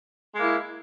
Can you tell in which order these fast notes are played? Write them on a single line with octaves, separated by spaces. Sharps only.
G#3 A#3 E4